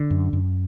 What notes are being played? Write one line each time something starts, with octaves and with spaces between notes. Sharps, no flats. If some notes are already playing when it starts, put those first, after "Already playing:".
Already playing: D3
F#2
F#2